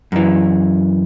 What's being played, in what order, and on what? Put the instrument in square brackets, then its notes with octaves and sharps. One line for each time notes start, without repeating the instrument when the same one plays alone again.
[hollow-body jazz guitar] F#2 E3